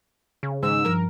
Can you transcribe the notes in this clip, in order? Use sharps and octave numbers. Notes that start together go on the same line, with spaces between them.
C#3
G#2 D#3 E6
G2 F3 A#4